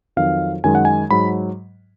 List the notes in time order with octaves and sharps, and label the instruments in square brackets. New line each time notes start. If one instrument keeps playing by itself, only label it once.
[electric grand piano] F2 D#3 F#3 F5
F#2 D#3 G#3 G#5
F#5
G#5
G#2 F#3 B5